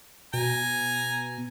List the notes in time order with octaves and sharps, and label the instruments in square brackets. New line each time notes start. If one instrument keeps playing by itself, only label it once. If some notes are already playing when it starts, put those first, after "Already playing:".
[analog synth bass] B2 [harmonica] G#5 A#5